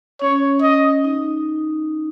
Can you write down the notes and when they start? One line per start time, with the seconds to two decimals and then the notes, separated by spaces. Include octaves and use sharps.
0.21 C#4 C#5
0.62 D#5
1.04 D#4